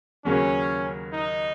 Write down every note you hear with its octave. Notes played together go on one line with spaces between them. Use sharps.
D#2 C#3 F#3 A#3 C#4
D#4